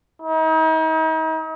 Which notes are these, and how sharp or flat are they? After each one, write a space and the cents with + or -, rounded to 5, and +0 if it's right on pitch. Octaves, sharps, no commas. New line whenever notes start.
D#4 +40